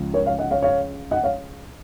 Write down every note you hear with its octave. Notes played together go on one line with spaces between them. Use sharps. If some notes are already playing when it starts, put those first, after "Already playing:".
Already playing: C#2 C#3 F3
A#4 C#5
C#5 F5
D#5 F#5
C#5 F5
C#5 F5
D#5 F#5
C#5 F5